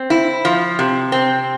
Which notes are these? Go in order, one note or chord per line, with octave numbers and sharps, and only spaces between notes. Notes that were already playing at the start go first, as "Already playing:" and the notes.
Already playing: C4
E4
F3
C3
C4